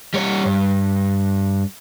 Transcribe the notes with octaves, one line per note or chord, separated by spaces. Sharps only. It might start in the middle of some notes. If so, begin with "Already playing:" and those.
G3 C#5
G2